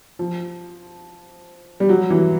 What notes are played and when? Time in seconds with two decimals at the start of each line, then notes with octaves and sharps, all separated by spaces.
0.19 F3
1.80 G3
1.89 F#3
2.10 E3